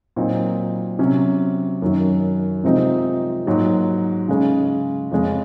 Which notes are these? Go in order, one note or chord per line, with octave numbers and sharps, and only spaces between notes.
A#2 F#3 C4 D#4
C3 F#3 C#4
F#2 D#3 F#3
C3 F3 G#3 C4 D#4
G#2 F#3 A#3
C#3 G#3 C#4
F2 C#3 G#3 C#4